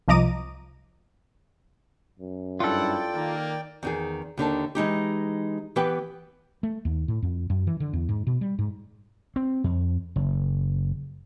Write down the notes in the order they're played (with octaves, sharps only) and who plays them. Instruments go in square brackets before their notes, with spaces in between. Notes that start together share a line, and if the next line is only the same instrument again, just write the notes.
[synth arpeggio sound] C2 F3 D#5 A#5 D6 D#7
[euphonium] F#2
[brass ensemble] G2 E4 F#5 [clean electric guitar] F4 A4 [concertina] D5 G5
[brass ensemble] D#3 A#3
[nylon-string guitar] E2 D#3 G#4
D#2 D3 D#3 A5
E3 G#3 D#4 G4
E3 B3 G4 B4 G5
[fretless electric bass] A3
D#2
A2
F2
F#2
E3
D3
E2
G#2
B2
G3
G#2
[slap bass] C4
F2
F#1